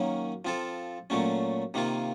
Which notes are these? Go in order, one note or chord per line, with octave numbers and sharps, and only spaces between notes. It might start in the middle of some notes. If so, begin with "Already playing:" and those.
Already playing: D#3 F#3 A#3 C#4
F3 C4 F4 A4
A#2 F#3 A3 C#4
C3 D#3 A#3 F4